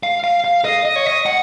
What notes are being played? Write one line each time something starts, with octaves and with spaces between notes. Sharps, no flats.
F5
F5
F5
D#5
D#5
C#5
D#5
F#5